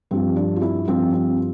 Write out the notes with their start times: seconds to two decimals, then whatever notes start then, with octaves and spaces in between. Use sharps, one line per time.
0.11 G2 F3 C4
0.36 D4
0.56 F4
0.62 E4
0.88 G2 F3 C4
1.13 C4